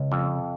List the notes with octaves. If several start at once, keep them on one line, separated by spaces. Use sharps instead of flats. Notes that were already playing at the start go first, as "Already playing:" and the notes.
Already playing: C#2 C#3
F2